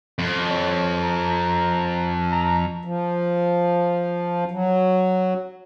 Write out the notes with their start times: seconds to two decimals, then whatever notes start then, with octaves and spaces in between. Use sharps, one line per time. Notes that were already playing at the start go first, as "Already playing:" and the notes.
0.19 F2
0.50 C#5
1.04 A#5
2.32 A#5
2.85 F3
4.51 F#3